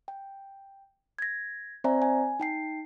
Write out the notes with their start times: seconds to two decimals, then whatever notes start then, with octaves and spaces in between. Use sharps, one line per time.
0.08 G5
1.19 G#6 A#6
1.84 C4 C5 D5 E5 G#5 A#5
2.02 G#5
2.40 D#4 G5 C7